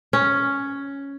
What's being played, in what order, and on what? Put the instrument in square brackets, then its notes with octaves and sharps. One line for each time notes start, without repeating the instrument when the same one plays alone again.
[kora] C#4